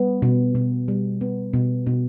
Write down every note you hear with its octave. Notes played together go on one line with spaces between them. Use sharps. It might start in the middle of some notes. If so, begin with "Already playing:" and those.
Already playing: G3 B3
B2
B2
G3
B3
B2
B2